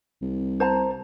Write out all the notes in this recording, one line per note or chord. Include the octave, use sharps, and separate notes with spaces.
C2
C5 A5 A#5